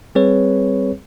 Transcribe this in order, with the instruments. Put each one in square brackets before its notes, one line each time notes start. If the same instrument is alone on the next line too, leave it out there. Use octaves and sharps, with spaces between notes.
[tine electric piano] G3 C4 G#4 B4 C#5